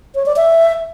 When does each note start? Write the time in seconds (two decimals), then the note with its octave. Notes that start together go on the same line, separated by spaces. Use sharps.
0.15 C#5
0.26 D5
0.36 E5